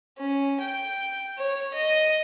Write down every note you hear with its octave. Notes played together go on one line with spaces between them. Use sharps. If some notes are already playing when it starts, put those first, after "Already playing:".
C#4
G5
C#5
D#5